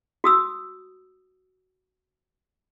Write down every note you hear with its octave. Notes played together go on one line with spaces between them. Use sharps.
F#4 D#6 E6